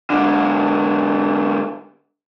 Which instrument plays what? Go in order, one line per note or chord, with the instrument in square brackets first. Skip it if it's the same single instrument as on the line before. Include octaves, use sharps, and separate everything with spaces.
[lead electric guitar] G#2 D3